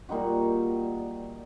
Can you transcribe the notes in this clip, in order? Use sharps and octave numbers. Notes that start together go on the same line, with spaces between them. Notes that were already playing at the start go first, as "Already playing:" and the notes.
A#2 G3 D#4 F#4